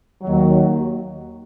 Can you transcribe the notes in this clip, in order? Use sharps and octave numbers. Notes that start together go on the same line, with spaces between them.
D#2 D#3 F#3